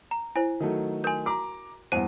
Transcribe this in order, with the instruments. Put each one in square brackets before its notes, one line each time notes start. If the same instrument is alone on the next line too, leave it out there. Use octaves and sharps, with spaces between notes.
[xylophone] A#5
[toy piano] E4 C5 [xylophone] G#5
[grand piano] D#3 F#3 A3
[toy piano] A#4 C6 [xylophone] G#5 G6
[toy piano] F#4 C6 [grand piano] A#5 D6
[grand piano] E2 G2 [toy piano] C5 F#5 G#5 [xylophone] D#7